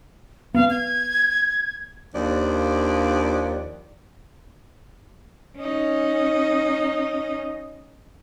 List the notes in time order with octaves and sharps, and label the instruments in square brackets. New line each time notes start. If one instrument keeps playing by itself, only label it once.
[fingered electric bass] B3 [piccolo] F5
[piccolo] G#6
[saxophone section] D#2 F3 D4 D5
[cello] C#4 D#4